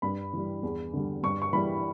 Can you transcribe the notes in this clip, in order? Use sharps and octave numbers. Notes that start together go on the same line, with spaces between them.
G2 B5
E3 G3
E2
D3 G3
G2 C#6
C#6
E3 G3 B5